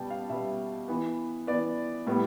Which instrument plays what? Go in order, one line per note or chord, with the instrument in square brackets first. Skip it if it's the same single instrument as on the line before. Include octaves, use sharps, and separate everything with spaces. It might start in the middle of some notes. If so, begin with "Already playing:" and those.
Already playing: [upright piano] B2 G3 B3 G5 A5
F5
B2 G3 B3 E5
E3 B3
E3 B3 D5
A2 G3 B3